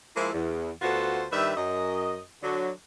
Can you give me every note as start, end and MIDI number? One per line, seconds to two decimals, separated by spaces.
0.16 0.30 53
0.16 0.30 56
0.16 0.30 58
0.16 0.30 64
0.33 0.70 40
0.82 1.25 38
0.82 1.25 59
0.82 1.25 65
0.82 1.25 66
0.82 1.25 69
0.82 1.25 72
1.32 1.55 43
1.32 1.55 51
1.32 1.55 55
1.32 1.55 71
1.32 1.55 76
1.56 2.19 42
1.56 2.19 75
2.42 2.70 50
2.42 2.70 54